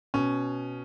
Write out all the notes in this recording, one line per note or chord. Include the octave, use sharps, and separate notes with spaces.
B2 C#4